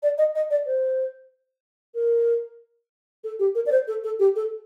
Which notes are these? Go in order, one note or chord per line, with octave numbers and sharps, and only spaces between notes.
D5
D#5
D#5
D5
C5
A#4
A4
G4
A#4
D5
C5
A4
A4
G4
A4